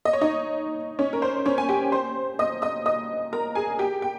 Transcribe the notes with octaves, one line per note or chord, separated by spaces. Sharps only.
D#5
C#5
D#4 D#5
C#4 C#5
A#4
C5
C#4 C#5
G#5
G4 G5
C5 C6
D#5 D#6
D#5 D#6
D#5 D#6
A#4 A#5
G#4 G#5
G4 G5
G5